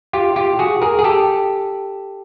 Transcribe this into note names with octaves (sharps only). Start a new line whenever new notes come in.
F4 G4
F4 G4
F#4 G#4
G#4 A#4
G#4
G4 A4